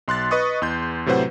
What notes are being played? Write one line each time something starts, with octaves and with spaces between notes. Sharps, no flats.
B1 C6 F#6 A6
B4 D#5 C#6 D#6 A6
E2 C6 G6
A2 C3 F#3 B4 C5 F#5